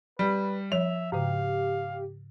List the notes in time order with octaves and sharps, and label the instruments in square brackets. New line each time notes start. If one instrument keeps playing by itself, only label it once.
[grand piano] G3 [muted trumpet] B4
[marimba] F3 C#5 [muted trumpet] E5 [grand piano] F7
[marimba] G#2 C#3 [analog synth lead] G4 [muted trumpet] F5